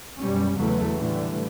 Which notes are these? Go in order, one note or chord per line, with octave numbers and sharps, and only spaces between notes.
F#2 B2 G3 C#4
E2 C#3 E3 F#3 A3
A2 D3 E3 G3 A3